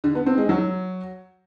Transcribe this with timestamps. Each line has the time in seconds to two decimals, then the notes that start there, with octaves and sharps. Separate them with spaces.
0.04 D3
0.15 B3
0.26 C4
0.38 G#3
0.49 F#3